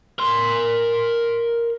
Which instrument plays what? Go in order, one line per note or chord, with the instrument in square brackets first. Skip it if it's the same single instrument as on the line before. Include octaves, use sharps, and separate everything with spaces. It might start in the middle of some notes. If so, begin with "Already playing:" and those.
[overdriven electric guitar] A#4 C6